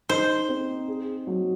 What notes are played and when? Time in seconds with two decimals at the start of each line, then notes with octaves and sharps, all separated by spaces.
0.09 D#4 C5
0.49 C4
0.88 G#4
1.27 F#3